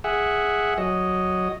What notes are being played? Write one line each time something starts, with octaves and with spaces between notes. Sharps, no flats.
G#4 E5 F#5
F#3 D#5